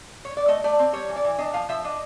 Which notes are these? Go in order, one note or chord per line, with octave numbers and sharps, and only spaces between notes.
C#5
D5
A3 D#5
A3 D5
C4
G3 C#5
E3
D5
E3
D4 D#5
F3 F5
F3 E5
D4 D#5